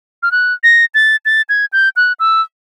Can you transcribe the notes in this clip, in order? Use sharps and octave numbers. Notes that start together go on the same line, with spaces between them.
F6
F#6
A#6
A6
A6
G#6
G6
F#6
E6